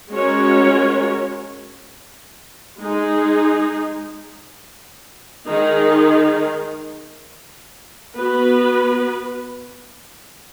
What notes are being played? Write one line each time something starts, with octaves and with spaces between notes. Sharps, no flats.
G#3 C#4 F#4 A#4 C#5
G#3 D#4 G#4
D#3 G#3 D#4 G#4
B3 F#4 B4